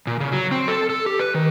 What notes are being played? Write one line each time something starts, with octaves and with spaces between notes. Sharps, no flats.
A#2
C#3
F#3
C4
A4
A4
G4
B4
D#3